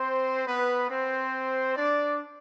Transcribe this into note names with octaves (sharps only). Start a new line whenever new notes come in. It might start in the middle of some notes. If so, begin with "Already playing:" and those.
Already playing: C4 C5
B3 B4
C4 C5
D4 D5